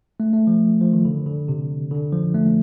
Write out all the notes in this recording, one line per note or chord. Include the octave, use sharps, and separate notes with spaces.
A3
A3
F3
F3
D#3
D3
D3
C3
D3
F3
A3